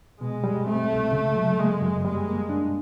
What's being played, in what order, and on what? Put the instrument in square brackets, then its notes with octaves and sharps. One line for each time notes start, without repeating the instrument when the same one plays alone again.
[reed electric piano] B2 [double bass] G#3
[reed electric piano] G3
[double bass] A3 [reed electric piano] C4
[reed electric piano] C2
C#3
F#3
[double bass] G#3 [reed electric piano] A#3
[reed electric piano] F#2
[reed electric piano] G3 [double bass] G#3
[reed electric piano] A#3
D4